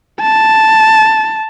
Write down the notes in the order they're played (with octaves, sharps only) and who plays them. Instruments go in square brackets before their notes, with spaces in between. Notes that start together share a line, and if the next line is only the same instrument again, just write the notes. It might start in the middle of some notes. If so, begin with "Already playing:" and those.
[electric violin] A5